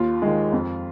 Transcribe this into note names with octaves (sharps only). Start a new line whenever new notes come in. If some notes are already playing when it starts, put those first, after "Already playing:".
Already playing: D#2 F4
D#3 G#3
F2